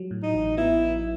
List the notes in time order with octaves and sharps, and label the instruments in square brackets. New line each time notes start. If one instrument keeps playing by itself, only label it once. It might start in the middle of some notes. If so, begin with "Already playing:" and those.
Already playing: [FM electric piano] F#3
A2
[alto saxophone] D#4
[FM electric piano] A1
[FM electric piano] B3 [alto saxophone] E4